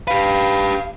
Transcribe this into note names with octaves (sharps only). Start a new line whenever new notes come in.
G4 B4 F5